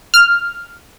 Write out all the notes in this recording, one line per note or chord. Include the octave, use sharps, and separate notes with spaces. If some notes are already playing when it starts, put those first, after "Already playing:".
F6